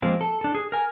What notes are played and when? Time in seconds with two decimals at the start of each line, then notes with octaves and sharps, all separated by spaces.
0.02 F3 G#3 A#3 C4
0.21 A4
0.41 D4 A4
0.55 G#4
0.72 A#4 G#5